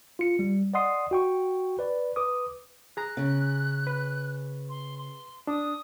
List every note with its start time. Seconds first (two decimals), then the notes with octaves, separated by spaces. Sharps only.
0.19 F4 C#7
0.39 G3
0.74 D5 D#5 F#5 C6 D#6 C7
1.11 F#4 G5 C#6
1.79 B4 D5
2.16 B4 D6 D#6
2.97 G#4 A#5 F#6
3.17 C#3
3.87 B4
4.69 C6
4.98 C6
5.47 D4 D#6